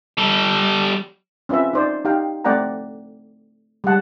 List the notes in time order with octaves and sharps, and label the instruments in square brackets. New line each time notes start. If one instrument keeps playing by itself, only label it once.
[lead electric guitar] G3 A4
[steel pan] C4 C#4 F4 B4 E5
D#4 C5 D5
D#4 G4 F5 G5
A3 C4 D5 F#5 G5 A#5
G3 G#3 F#5 A5